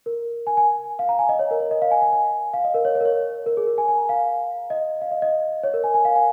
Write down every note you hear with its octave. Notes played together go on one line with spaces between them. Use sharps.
A#4
G#5
G#5
F5
A#5
G#5
D#5
C#5
A#4
C#5
D#5
F5
G#5
G#5
G#5
F5
D#5
A#4
C#5
C#5
A#4
C#5
A#4
G#4
A#4
G#5
G#5
A#5
F5
D#5
F5
D#5
D#5
C#5
A#4
G#5
G#5
F5
G#5